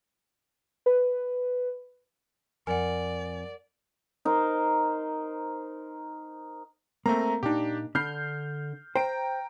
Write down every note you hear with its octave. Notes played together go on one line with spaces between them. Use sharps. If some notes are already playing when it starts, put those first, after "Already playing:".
B4
F2 A#4 D5 F#5 G#5
D#4 A#4 C5
A3 A#3 C4 A#5
A#2 D4 D#4 G4
D3 D4 B5 F6 G6 C7
C5 G5 A#5 D7